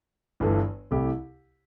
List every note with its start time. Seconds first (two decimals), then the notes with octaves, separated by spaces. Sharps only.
0.40 G1 G2 E3 A3
0.91 C2 C3 A3 E4 G4